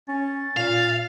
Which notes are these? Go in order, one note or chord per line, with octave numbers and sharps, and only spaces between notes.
C#4 A6
A#2 F5